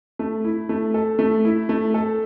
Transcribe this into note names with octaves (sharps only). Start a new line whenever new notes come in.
A3
E4
A3
A4
A3
E4
A3
A4